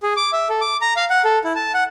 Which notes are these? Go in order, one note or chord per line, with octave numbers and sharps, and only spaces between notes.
G#4
D6
E5
A4
D6
A#5
F5
F#5
A4
E4
A5
F#5